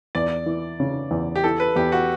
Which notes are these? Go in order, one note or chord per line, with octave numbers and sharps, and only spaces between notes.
E2 D5
E3
C#3
E2
G4
E3 A4
B4
E2 G4
F#4